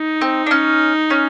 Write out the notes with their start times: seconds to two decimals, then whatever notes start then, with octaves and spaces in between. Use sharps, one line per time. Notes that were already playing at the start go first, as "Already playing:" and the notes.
Already playing: D#4
0.21 C4
0.46 D4
0.51 C#4
1.10 C#4